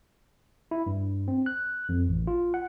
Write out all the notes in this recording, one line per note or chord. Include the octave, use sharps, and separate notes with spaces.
E4
G2
C4
F#6
F2
A1
F4
F#5